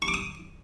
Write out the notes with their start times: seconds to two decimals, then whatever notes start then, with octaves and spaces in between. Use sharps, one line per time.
0.02 C#6
0.08 D6
0.14 D#6